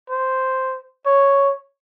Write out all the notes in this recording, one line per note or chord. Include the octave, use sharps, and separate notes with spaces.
C5
C#5